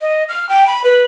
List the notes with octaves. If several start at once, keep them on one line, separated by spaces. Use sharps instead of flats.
D#5
F6
G5
B5
B4